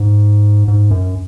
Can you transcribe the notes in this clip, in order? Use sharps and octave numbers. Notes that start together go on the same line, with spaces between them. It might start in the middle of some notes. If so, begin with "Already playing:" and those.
Already playing: G#2
G#2
F#2